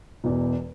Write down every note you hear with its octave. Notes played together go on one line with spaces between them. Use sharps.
E1 E2 B2